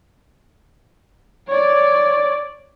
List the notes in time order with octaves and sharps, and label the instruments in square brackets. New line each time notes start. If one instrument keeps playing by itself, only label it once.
[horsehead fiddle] C#5 D5